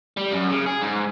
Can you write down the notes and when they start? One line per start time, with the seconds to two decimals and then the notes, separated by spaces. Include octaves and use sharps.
0.17 G3
0.32 F#2
0.50 C#3
0.66 G#4
0.82 G#2